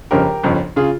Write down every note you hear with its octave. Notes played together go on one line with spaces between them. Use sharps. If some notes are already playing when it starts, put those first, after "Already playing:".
G1 F2 C#3 G4 A#4
G1 F2 C#3
C#3 F4 G#4